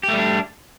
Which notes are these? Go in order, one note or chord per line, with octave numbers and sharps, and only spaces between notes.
G3 A3 D4 G4